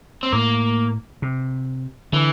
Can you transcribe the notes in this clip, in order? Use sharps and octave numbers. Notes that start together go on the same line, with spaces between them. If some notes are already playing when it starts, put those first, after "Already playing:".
C4
A2 A#3
C3
D3 E3